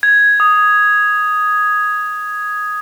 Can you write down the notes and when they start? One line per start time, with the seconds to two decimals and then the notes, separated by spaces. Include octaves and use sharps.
0.03 G#6
0.40 D#6